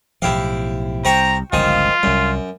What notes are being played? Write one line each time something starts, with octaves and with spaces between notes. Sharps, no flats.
B1 A2 F3 E4 G4 F5
C2 C5 G5 A#5 C#6
G1 C#2 D#3 F3 F4 G#5
C2 F#2 G3